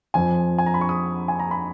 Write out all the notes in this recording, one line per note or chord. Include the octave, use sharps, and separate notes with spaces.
F2 F3 G#5
G#5
A#5
B5
C#6
D#6
G#5
A#5
B5